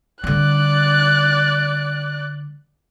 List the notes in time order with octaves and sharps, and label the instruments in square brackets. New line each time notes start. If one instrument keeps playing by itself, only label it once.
[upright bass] D3 G3 [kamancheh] D5 F#6